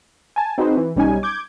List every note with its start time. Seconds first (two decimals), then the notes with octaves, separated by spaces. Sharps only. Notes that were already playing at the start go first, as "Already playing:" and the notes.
0.36 G#5 A5
0.58 C4 D#4 F#4 G#4 B4 C5
0.77 E3
0.96 B1 G3 C#4 D#4 G#5
1.23 D6 G6 G#6